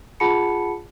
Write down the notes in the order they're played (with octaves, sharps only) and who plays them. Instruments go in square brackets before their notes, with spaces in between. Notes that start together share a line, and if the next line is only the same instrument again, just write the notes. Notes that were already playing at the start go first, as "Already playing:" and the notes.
[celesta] F4 G#4 F#5 A5 B5 C#7